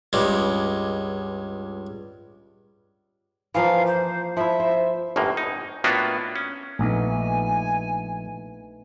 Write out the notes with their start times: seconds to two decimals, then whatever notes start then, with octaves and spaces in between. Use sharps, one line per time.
0.13 C#2 G2 G#3
3.55 E3 F3 A#3 F5
3.87 C5
4.37 F3 E4 E5
4.60 C5
5.16 G1 F#2 A2 A#3
5.37 D#4
5.84 A2 A#3 B3 D4 F4 F#4
6.36 C#4
6.79 A#1 A3 B3 D#4 G#5